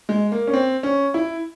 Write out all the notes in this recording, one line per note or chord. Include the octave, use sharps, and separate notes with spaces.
G#3
A#3
C#4
C4
C#4
E4